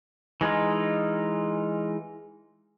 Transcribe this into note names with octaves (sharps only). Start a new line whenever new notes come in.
E3 G#3 D#4 F4